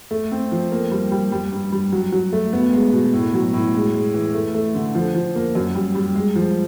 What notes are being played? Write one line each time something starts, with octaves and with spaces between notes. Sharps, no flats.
A3
C4
F3
A#3
G3
G3
G3
G2
G3
F#3
F#3
A3
B3
G#3
B2
A2
F#3
A2
G#3
G#3
E3
A3
A3
D3
F3
F3
A#3
F#2
G3
G3
G#3
F3